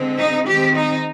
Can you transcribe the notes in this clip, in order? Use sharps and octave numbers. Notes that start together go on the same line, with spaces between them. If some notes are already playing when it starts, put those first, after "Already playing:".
Already playing: D3 G#3 C4
D#4
D#3 G#3 C4 G4
D#4